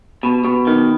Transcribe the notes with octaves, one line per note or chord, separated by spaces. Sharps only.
B2
B2
D#3